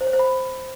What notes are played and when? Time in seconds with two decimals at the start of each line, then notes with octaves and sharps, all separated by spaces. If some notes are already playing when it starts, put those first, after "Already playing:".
0.01 C5
0.07 C#5
0.13 C5
0.19 B5